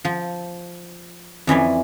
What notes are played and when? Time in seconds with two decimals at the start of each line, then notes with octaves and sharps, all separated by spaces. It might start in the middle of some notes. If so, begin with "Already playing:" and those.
0.05 F3
1.47 F2 E3 C#4 D5